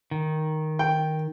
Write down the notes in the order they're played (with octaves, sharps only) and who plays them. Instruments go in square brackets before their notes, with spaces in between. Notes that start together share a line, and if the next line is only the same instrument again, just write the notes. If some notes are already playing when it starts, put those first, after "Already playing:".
[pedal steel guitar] D#3
[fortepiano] G5